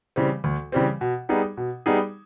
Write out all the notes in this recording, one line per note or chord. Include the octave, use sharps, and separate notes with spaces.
C#3 E3 G3 C4
D2
C#3 E3 G3 C4
B2
G3 B3 D#4 G#4
B2
G3 B3 D#4 G#4